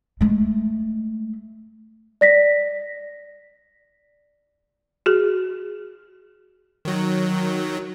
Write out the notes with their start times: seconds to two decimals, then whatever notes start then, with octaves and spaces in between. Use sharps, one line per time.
0.21 G#3 A3
2.21 D5 A#6 B6
5.06 F#4 G#4
6.85 D#3 F#3